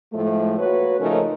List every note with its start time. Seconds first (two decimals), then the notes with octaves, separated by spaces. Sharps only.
0.13 A2 F3 G#3 A3
0.58 A#3 F#4 B4 C#5
1.00 C#3 F3 A3 C#4 D#4 A#4